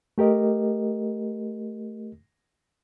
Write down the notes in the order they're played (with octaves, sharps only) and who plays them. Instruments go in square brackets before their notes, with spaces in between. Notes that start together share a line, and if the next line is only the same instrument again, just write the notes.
[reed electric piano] A3 G4 A#4 D#5